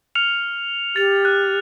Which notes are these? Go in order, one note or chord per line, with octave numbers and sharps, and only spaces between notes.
F6 C#7 F7
G4 A6 F7
F#6